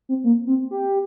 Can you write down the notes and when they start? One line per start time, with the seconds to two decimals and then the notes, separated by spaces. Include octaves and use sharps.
0.09 C4
0.24 A#3
0.47 C4
0.71 G4